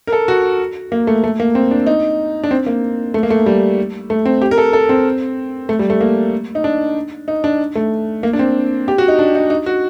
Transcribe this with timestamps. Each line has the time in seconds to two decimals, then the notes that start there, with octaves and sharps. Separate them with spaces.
0.07 A#4
0.13 A4
0.28 F#4
0.92 A#3
1.07 A3
1.24 A3
1.40 A#3
1.55 C4
1.71 D4
1.87 D#4
2.44 D4
2.51 C4
2.66 A#3
3.14 A3
3.23 A#3
3.30 A3
3.46 G3
4.10 A3
4.25 C4
4.42 G4
4.51 A#4
4.58 A4
4.73 A4
4.89 C4
5.69 A3
5.79 G3
5.90 A3
6.01 A#3
6.55 D#4
6.64 D4
7.28 D#4
7.44 D4
7.75 A3
8.23 A#3
8.33 D4
8.39 C4
8.88 G4
8.98 F#4
9.08 D#4
9.19 D4
9.35 D#4
9.50 D#4
9.66 F#4